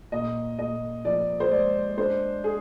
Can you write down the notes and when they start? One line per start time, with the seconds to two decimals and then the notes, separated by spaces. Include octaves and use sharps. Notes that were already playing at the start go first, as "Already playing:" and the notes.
0.12 A#2 D#5
0.59 A#2 D#5
1.05 F3 D5
1.40 C5
1.51 G#3 D5
1.98 D4 C5
2.44 G#4